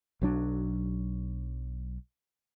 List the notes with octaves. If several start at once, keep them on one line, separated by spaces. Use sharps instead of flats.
B1 F#3 D4